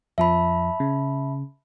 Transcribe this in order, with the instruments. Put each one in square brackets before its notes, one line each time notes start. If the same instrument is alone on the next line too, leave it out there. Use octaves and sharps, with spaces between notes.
[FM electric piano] F2 F3 [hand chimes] E5 A5 B5
[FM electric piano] C#3